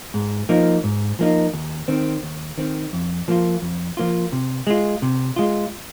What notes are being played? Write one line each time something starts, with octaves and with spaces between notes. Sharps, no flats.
G#2
F3 A#3 D#4
G#2
F3 A#3 D#4
D#2
D#3 C4
D#2
D#3 C4
F2
F3 A#3 F4
F2
F3 A#3 F4
C3
G#3 F4
C3
G#3 F4